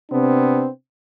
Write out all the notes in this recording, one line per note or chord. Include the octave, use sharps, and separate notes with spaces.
C3 B3 C4 D4